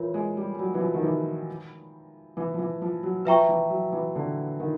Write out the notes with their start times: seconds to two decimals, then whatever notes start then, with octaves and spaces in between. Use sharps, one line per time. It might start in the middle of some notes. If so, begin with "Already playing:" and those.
Already playing: E3 F4 A#4 C#5
0.14 G#3
0.37 G3
0.55 G3
0.59 F#3
0.74 E3
0.81 F3
0.94 D#3
1.03 E3
2.37 E3
2.54 F3
2.59 E3
2.82 F3
3.03 F#3
3.25 F3 B4 E5 G5 A#5 C#6
3.48 E3
3.70 F#3
3.92 E3
4.15 D3
4.60 D#3